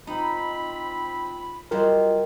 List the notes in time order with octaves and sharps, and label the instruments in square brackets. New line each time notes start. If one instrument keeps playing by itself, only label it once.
[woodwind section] C4 F4 B5 [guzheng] D#4
[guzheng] F#3 G3 C5 [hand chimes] F4 D#5 [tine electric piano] A#4